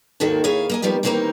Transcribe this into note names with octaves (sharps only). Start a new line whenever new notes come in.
D#2 G#2 D#3 A#3 F#4 A4
D#2 E4 G#4 C#5 F5
A#3 D#5 G#5
D#3 F3 G3 B3 G4
D#3 E3 G3 A#3 C4 D#4